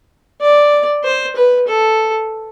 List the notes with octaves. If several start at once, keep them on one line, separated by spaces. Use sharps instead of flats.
D5
C5
B4
A4